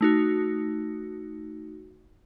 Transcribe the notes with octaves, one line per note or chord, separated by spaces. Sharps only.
A3 D#4 F#4